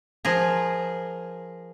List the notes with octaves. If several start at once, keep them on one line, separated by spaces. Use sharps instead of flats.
F3 G#4 A#4